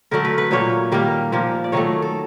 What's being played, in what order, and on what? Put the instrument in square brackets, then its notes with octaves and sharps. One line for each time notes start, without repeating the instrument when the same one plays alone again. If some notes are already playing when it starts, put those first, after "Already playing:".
[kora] D3 F#3 A3 A#4
B4
B4
A#2 F#3 A#3 C#5
D#3 G3 A#3
A#2 F3 A#3
D5
D#3 F#3 A3 C#5
A4